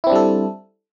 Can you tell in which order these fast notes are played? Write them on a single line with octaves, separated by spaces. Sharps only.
E4 C4 D4 G3 A4